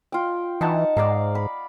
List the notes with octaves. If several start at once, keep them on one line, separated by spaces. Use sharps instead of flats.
F4 G5
E3 D#4 F#5 A5
G#2 D5 F5 A#5
B5